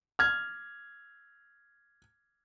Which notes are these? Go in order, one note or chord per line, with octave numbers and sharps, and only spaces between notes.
F6 G#6